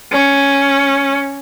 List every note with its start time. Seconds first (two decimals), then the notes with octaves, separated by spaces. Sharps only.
0.12 C#4